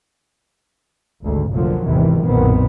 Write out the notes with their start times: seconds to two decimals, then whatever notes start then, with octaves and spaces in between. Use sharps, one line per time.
1.23 G#1 D2 G#2
1.52 F1 A#1 A#2 D3 F3 F#3
1.85 G#1 E2 C3 D#3 E3
2.24 B1 F#2 A#2 D#3 B3 C4